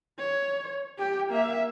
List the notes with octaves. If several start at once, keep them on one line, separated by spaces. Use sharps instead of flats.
C#5
G4 G5
A#3 E5